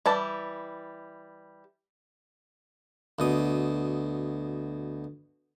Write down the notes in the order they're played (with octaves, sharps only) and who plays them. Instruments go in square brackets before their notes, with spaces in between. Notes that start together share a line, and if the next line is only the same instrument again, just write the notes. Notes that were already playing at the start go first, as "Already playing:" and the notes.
[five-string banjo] E3 G3 A5
[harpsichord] D2 B2 D#6